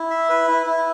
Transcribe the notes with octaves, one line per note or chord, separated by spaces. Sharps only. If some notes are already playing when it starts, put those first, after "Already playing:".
Already playing: E4
E5
B4
E4
E4